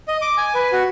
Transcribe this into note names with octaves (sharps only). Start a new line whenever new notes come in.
D#5
D6
G#5
B4
F#4